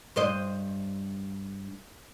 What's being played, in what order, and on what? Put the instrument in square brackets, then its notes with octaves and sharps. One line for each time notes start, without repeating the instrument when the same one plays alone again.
[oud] G2 C5 D#5